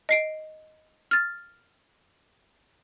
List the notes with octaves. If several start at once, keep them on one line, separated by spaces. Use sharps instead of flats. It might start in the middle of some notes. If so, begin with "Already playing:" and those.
D#5 C7 D7
F6 A6